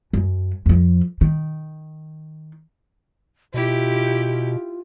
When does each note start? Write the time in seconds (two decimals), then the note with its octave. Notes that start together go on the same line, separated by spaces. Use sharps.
0.13 F#2
0.66 F2 F3
1.21 D#3
3.54 B2 E4 F4 G4